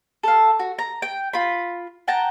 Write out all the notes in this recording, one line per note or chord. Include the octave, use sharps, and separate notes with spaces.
A4 F5
F#4
A#5
G5
F4 B5
F#5 G5 A5 A#5